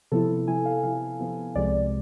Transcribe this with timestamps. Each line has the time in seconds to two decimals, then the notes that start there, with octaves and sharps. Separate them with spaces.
0.12 C3 F3 B3 E4 A4
0.48 C3 F3 B3 E4 G#5
0.66 F5
0.83 C3 F3 B3 E4 F5
1.19 C3 F3 B3 E4
1.55 C2 C3 F3 G#3 D5